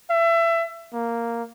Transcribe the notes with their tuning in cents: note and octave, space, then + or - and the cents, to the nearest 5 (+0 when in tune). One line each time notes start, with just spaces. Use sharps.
E5 +25
A#3 -5